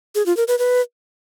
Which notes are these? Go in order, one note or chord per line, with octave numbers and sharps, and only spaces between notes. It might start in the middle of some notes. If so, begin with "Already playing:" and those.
G#4
F4
A#4
B4
B4